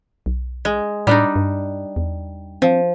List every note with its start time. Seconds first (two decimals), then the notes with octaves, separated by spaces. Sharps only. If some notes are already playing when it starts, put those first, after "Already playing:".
0.26 B1
0.65 G#3
1.07 A2 G3 D4 D#4
1.36 G2
1.96 E2
2.62 F3 C4